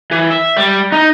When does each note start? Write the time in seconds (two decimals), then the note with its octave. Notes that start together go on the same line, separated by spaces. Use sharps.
0.12 E3
0.31 E5
0.57 G3
0.92 D#4